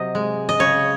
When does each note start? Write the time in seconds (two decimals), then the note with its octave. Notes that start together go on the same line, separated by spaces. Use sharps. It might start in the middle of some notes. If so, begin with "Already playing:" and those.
Already playing: C3 F#3 D#5
0.15 G#3
0.49 D#5
0.60 C#3 C#5